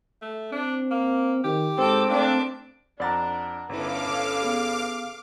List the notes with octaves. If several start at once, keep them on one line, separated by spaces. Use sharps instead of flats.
A3
C4 D4
A#3
D#3 G4
G#2 C4 A4 D6
A3 A#3 D4 D6
F2 D4 D5 F#5 A#5 A6
G1 C#4 E4 A4 B4 F5 D6
B3 G#4